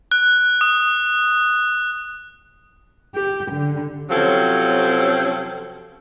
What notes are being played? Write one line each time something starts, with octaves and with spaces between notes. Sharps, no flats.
F#6
D#6
G4
D3
C3 F3 F#3 C4 C#4 A4